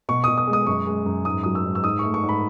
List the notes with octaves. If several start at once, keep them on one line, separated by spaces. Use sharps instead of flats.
B2 C#6
B2 D#6
D#6
G#3
D#6
F#2 C#6
G#3
F#2
G#2 D#6
F#3 D#6
E6
G#2
E6
G#2 D#6
A3 C#6
C#6
G#2
B5